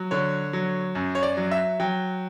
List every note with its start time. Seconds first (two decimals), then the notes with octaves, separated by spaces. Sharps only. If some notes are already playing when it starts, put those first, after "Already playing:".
Already playing: F#3
0.11 D3 C#5
0.53 F#3
0.95 F#2
1.15 C#5
1.23 D5
1.37 F#3
1.51 E5
1.80 F#3 G5